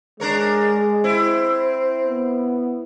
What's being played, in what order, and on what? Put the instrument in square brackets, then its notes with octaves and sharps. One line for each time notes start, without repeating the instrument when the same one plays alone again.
[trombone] G#3 [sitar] D4 A#4 C#5
[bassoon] C4 [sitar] E4
[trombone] B3